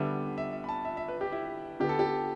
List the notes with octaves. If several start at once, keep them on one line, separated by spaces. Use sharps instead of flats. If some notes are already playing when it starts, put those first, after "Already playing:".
Already playing: D3 G3 B3 E5
E5
E5
B5
A5
E5
E5
B4
G4
E4
D3 B3 G4
A4
G4